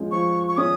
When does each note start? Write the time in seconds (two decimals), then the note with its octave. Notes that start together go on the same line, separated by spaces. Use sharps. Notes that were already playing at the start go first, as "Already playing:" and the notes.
Already playing: F3 G#3 C#4
0.11 F3 C#6
0.48 C#6
0.57 C#4 D#6